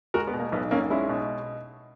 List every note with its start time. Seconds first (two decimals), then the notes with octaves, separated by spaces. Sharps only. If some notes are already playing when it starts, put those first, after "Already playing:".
0.14 G#3 F#4 A#4
0.27 B3
0.33 B2
0.39 A#3
0.52 B1 B3
0.71 B1 A#3 C#4
0.90 G#3 C#4 E4
1.09 B2